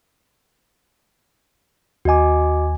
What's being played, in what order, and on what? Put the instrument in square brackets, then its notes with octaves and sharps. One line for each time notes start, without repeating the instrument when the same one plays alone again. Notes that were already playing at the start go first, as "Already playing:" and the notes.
[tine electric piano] D#2 G#5 [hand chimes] F#4 D#5 D6